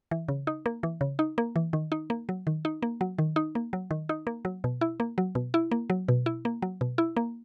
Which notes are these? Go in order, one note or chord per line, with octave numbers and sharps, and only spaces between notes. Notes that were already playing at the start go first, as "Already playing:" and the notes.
E3
C#3
D#4
A#3
E3
C#3
D#4
A#3
E3
D#3
D#4
A#3
F#3
D#3
D#4
A#3
F#3
D#3
D#4
A#3
F#3
D#3
D#4
A#3
F#3
B2
E4
A#3
F#3
B2
E4
A#3
F#3
B2
E4
A#3
F#3
B2
E4
A#3